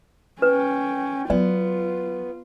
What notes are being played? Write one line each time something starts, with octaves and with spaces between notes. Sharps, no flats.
C#4 B4 G5
F#3 B3 F4 D5